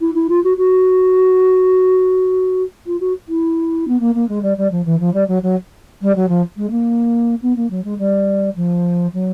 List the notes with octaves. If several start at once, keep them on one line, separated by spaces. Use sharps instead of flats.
E4
E4
F4
F#4
F#4
F4
F#4
E4
B3
A#3
A#3
G#3
G3
G3
F3
E3
F3
G3
F#3
F#3
G3
F#3
F3
G#3
A#3
B3
A#3
F#3
G#3
G3
F3
F#3